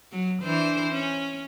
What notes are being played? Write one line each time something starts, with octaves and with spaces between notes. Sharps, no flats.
F#3
E3 D4 C5
C#4